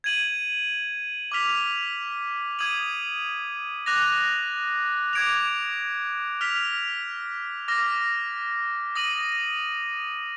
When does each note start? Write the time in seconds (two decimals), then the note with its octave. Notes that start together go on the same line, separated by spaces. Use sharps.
0.04 G#6 D#7 F#7
1.32 D6 F6 B6 F7
2.59 D#6 G#6 D#7 F#7
3.86 D6 F#6 A#6 F7
5.13 D6 G#6 D7 F7
6.41 F6 B6 F7
7.68 D6 F6 A#6
8.95 D#6 A#6 D#7 F#7